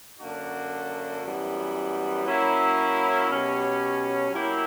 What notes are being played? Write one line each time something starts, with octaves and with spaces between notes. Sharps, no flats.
F#2 D3 A#3 D4 F#4
F#2 E3 G3 B3
F#3 A#3 C#4 E4
B2 F#3 C#4 G4
F#3 A#3 E4 G4